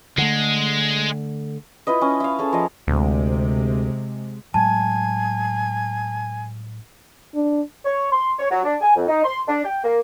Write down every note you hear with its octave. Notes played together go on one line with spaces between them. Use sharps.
D3 G#3 A3
E4 F4 B4 D#5
C#4
E4 F5
C#4 G#4 A4
F3 D#5
D2 C3 G#3
A2 F#3 G#3 G#5 A5
D4
C#5
C6
C#5
F#3
D4
G#5
F2
D#4
C6
D4
G5
A#3